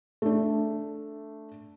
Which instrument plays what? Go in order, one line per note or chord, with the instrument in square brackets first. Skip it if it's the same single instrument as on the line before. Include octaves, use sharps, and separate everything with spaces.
[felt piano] A3 D4